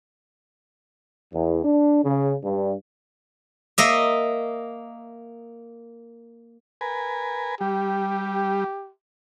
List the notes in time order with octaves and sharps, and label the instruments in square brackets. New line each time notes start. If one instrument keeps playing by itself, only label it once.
[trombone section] E2
D4
C#3
G2
[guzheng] A#3 D#5 E5
[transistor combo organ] A#4 B4 G#5
[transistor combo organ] G3 [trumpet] G4